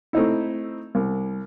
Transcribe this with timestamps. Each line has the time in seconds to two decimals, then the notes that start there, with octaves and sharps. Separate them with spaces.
0.13 A3 C4 D#4 E4
0.95 C2